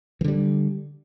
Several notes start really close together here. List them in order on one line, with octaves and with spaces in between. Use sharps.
E3 D3 G3